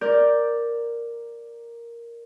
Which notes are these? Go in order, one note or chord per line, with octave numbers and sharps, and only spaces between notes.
A#4 D5 D6 G6